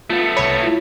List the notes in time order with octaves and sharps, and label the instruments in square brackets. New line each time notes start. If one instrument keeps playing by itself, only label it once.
[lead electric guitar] A3 B3 [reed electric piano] F4 F5
[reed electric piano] C2 B5 [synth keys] C#5
[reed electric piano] E4 F4